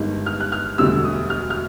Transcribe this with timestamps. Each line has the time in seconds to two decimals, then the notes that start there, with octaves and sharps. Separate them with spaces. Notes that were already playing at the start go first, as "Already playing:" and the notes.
Already playing: G1 G2 D#3 G#3
0.26 F6
0.40 F#6
0.52 F6
0.78 E1 D2 D3 G3 E6
1.04 D#6
1.30 F6
1.50 F6